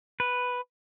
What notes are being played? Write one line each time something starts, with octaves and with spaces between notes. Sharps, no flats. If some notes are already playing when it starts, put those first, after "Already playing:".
B4